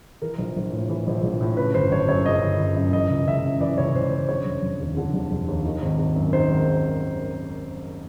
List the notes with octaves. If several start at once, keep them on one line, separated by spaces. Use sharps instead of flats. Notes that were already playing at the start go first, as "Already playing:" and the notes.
E3 A#4
A#1
A#1
A2
E3
A#1
A#1
A2
C#3 B4
G1 C5
G1 C#5
F#2 C#5
C#3 D#5
G1
G1
F#2
E3 D#5
C#2
C#2 E5
C#3
E3 D5
C#2 C#5
C#2 C5
C#3 C5
D3 C#5
F1
F1
D#2
D3
F1
F1
D#2
D#3
G#1
G#1
F#2
D#3 C5
G#1